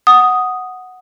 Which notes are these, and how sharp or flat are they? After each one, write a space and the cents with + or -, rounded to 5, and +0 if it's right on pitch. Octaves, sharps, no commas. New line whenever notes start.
F#5 +0 D#6 +0